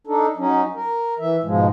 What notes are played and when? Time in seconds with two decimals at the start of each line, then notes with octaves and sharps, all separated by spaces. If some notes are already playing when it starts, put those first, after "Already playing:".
0.07 D4 D#4 A4
0.37 F#3 C#4 D#4
0.75 A#4
1.19 E3 E5
1.44 G#2 B2 F3 G#3